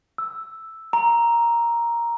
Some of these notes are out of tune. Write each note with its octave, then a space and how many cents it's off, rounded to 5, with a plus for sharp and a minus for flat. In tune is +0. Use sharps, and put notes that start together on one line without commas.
E6 +0
A#5 +5